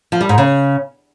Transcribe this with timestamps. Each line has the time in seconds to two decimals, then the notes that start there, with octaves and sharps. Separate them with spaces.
0.12 F3
0.21 G3
0.29 G#2
0.38 C#3